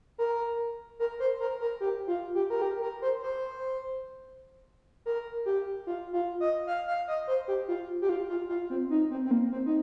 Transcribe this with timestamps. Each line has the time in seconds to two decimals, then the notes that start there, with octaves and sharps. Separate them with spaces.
0.18 A#4
0.99 A#4
1.20 C5
1.40 A#4
1.61 A#4
1.80 G4
2.07 F4
2.35 G4
2.50 A#4
2.62 G4
2.82 A#4
3.02 C5
3.22 C5
5.06 A#4
5.46 G4
5.87 F4
6.13 F4
6.40 D#5
6.67 F5
6.87 F5
7.08 D#5
7.27 C5
7.48 G4
7.68 F4
8.02 G4
8.09 F4
8.29 F4
8.49 F4
8.70 C4
8.90 D#4
9.11 C4
9.25 C4
9.31 A#3
9.51 C4
9.66 D#4